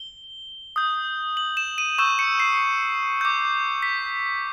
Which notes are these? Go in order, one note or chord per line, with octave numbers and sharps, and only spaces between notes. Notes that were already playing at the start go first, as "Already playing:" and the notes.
Already playing: G7
D#6 G6
F#7
E7
D#7
C#6 E6 G6 E7
C#7
C7
D6 G6
B6